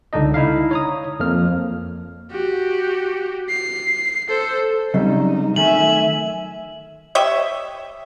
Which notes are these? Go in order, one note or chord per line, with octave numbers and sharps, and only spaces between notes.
C#2 D3 D4 D#4 D#5
D#4 E4 E5 F5
C#5 A#5 D#6
F2 F3 A#3 F6
F#4 G4
C7
A4 C5
C#3 F#3 G3 D#4
D#3 A3 E5 G#5 F#7
G4 C#5 D#5 E5